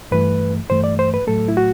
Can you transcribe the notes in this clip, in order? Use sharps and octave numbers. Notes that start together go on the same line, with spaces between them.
G2 E3 A3 B4
G2 E3 A3 C5
D5
C5
B4
A2 F#3 A3 A4
E4
F#4